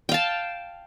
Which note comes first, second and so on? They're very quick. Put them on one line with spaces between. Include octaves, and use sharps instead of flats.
G5 F5 A5